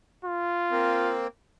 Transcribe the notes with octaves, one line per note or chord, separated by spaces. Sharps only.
F4
A#3 C4